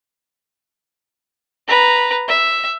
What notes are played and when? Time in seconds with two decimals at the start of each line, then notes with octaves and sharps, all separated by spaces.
1.68 B4 A#5
2.28 E5